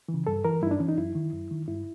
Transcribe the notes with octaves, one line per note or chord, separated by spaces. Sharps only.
E3
C#3
G2 A4
E3 A#4
G2 E4
D#4
D4
E3 C#4
D#4
F#2 E4
D#3
F#2
D#3
G2 E4